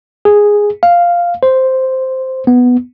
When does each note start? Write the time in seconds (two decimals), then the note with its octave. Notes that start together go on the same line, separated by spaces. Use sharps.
0.25 G#4
0.83 F5
1.43 C5
2.47 B3